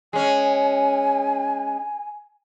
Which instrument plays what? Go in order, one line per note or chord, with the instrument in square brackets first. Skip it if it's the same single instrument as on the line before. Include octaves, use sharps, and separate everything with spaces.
[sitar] G#3 C#4 [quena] G#5